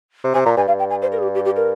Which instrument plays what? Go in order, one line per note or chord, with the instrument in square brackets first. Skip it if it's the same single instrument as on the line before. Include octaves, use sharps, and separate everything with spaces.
[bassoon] C3
[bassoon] C3 [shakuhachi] G#5
[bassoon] A#2 [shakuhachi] A#5
[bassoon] G2 [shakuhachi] G#5
[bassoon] G2 [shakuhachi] F5
[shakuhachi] G5
G#5
C5
A#4
G#4
G4
G4
G4
A#4